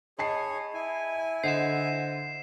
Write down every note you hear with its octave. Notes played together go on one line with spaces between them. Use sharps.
G#4 C#5 D#5 A5 B5 C7
E4 G#5
D3 C5 D#5 F#5 C7 E7